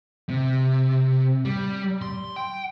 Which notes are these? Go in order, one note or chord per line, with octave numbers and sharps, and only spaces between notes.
C3
G3
C6
G5